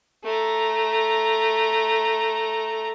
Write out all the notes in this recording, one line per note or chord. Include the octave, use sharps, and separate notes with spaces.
A3 A#5